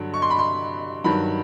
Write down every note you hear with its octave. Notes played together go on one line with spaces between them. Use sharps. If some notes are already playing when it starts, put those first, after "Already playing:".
Already playing: G2 D3 F#3
C#6
C6
B5
C6
G2 D#3 F#3 B5